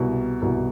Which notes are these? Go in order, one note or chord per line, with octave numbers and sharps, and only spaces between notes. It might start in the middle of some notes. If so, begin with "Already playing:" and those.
Already playing: C2 B2
C2 B2